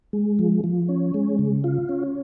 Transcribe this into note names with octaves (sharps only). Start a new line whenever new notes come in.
G#3
F3
F3
C#4
G#3
C#3
F4
C#4